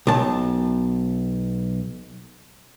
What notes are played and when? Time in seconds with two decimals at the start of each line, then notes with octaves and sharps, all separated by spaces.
0.07 B1 A5